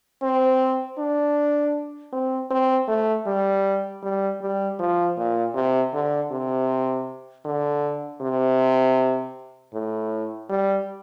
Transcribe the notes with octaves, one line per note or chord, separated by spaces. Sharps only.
C4
D4
C4
C4
A3
G3
G3
G3
F3
A#2
C3
D3
C3
D3
C3
A2
G3